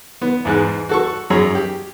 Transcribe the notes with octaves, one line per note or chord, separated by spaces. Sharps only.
B3
E2 G#2 G#3 F#6
F#4 A4 C#6
F#2 G#4 C#5 A#5
G4